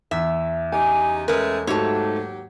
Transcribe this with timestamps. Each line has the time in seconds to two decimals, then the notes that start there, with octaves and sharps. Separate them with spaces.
0.11 E2 E5
0.72 C#3 D#4 G4 G#5
1.28 G#3 A3 C#4 A#4 B4
1.67 D#2 G#2 F#3 A3 F#4 G4 C#5 A5